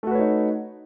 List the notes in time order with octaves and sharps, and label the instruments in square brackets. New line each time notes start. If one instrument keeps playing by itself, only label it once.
[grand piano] A3
F#4
B4
C#5
D#4